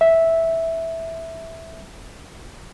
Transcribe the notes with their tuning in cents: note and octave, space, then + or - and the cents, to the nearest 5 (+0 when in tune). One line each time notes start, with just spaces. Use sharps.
E5 -5